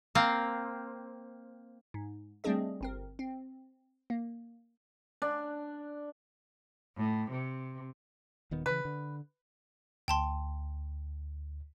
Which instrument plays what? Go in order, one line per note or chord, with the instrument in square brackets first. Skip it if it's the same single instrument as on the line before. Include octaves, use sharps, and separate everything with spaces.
[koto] A#3 C4
[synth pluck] G#2
G3 A3 C4 D4 G#4 D#5
G1 C4 A#4
C4
A#3
[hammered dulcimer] D4
[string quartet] A2
C3
[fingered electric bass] D#1 D#3 B3
[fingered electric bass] C#3 E3 [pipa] B4
[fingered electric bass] D3
[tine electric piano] D2 [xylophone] G5 A5 C6